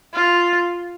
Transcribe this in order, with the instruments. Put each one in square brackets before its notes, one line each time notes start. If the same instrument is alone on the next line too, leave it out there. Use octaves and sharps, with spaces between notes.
[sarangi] F4